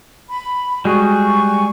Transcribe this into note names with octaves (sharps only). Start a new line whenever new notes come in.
B5
G3 G#3 F#4 G#4 C#6